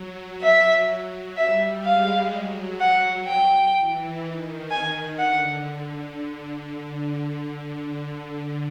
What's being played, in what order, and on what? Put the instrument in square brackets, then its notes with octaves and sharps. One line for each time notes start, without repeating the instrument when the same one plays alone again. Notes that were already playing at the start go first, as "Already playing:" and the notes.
Already playing: [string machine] F#3
[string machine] F#3 [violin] E5
[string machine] G3 [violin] E5
[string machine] G#3 [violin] F5
[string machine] F#3
[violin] F#5
G5
[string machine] E3
D#3
[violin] G#5
[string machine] D3 [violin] F#5